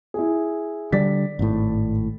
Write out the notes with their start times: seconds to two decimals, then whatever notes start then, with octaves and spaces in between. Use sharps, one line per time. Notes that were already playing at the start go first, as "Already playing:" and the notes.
0.14 E4 G#4
0.92 D3 G3 D5 A6 B6
1.39 G#1 A2